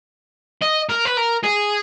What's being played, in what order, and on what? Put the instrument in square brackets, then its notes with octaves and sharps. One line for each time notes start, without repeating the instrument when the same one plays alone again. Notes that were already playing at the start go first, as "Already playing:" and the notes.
[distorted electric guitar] D#5
A#4
B4
A#4
G#4